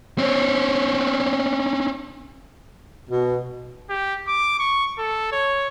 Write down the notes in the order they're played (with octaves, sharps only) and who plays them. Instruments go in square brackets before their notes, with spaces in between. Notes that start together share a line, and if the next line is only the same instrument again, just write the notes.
[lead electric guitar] C4 C#4
[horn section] B2
[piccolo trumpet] G4
D6
C#6
A4
C#5